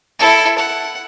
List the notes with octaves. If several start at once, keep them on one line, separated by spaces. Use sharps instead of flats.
E4 A4
F#5